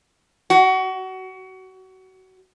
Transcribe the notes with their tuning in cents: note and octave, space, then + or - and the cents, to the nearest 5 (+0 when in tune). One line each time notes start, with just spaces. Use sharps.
F#4 +25